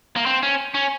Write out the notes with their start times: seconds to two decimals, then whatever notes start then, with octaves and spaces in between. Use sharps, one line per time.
0.16 A#3
0.26 C4
0.43 C#4
0.74 C#4